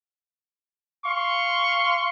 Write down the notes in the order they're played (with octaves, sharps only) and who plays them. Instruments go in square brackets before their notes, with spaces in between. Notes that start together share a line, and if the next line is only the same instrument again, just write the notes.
[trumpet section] F5 C6 C#6